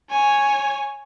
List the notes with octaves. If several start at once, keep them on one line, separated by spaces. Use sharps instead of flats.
C#5 G#5